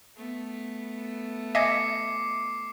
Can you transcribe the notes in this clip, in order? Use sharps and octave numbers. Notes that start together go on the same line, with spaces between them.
A3 B3
D#5 E5 G#5 D6 C7 C#7